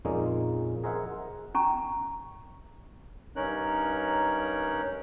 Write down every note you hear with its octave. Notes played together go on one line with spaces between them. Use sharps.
F2 A#2 G#3 A#3 C#4 D#4
G#4 A#4 C5 D#5 E5 F#5
C#4 G#5 A#5 C#6
G2 C#4 D#4 A#4 C#5 F#6